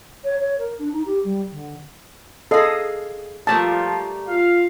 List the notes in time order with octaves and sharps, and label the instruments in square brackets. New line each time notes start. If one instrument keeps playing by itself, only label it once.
[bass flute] C#5
C#5
A#4
D4
D#4
G4
G3
D3
[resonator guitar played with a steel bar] G#4 F5 [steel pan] A4 D#5
[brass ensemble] F3 [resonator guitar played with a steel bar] G3 A3 A#3 [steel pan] A5
[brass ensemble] F4 F5